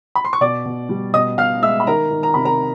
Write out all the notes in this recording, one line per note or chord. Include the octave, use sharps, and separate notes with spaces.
B5
C6
C#6
B2 D5 D6
B2
G3
B2 D#5 D#6
B2 F5 F6
G#3 E5 E6
B5
D#3 A#4 A#5
D#3
A#5
C3 B5
A#4 A#5